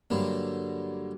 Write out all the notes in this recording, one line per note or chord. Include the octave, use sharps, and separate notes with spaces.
G2 D3 F#3 G3 A#3